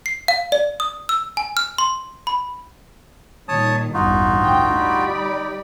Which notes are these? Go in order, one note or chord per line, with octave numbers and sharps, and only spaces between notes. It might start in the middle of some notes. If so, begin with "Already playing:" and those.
C7
F5
D5
D#6
E6
G#5
F6
C6
B5
A#2 D#3 G3 C#5 A5 D#6
A1 E2 G2 D#4 F4 F#4
D2 G5
G3 D5 B5
D#4